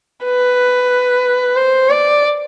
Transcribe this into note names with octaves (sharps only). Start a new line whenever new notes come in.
B4
C5
D5